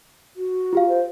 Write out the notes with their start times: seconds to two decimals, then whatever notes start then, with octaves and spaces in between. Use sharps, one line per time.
0.36 F#4
0.73 F4 G4 F5
0.89 C5